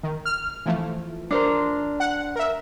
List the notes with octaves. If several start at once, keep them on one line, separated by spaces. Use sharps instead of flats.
D#3
F6
E3 F3 A3
D4 A#4 C5
F#5
A#4 E5